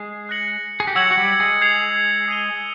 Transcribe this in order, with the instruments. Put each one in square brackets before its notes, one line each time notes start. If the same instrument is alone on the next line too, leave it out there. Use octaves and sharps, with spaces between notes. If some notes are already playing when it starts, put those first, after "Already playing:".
Already playing: [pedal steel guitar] G#3 G#4
[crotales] F#6 A#6 C#7 F#7
[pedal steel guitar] G#4
G4
[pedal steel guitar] F#3 F#4 [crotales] E6 G#6 C#7 F#7
[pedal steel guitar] F#4
G3 G4
G#3 G#4
[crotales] G#6 C7 F7
D#6 G#6 C7 D#7 G7